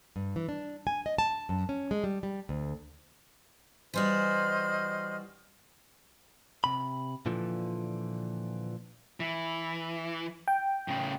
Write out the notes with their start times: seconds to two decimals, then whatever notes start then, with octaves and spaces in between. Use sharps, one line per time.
0.16 G2
0.36 E3
0.49 D4
0.87 G#5
1.06 D#5
1.18 A5
1.49 F#2
1.69 C#4
1.91 G#3
2.04 G3
2.23 G3
2.49 D2
3.94 E3 G3 F#4 C5 D#5 F6
6.64 C3 B5
7.26 A#2 D3 E3 F3
9.20 E3
10.48 G5
10.88 A2 C#3